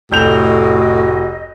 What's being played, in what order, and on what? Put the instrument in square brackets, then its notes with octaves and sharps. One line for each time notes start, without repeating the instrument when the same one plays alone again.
[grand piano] F1 G6 F7 [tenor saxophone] A2 [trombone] F#4 [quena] D#5